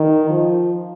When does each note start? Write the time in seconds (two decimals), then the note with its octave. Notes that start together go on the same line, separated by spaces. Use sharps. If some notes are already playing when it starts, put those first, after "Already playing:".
Already playing: D#3
0.29 F3